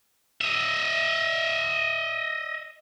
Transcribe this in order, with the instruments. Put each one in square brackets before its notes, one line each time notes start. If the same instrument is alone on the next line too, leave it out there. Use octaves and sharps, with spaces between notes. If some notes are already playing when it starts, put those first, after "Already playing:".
[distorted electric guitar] D#5 E5